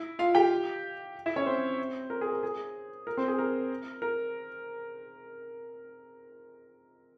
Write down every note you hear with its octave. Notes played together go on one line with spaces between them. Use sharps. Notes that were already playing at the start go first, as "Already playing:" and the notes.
Already playing: E4
F4 F5
G4 G5
E4 E5
C#4 C#5
C4 C5
A#4
G#4
A#4
G#4
A#4
C4 C5
G#4
A#4
A#4